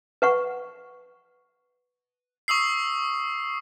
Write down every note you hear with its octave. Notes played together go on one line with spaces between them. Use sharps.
B4 F#5 C#6
C#6 D#6 E6 C7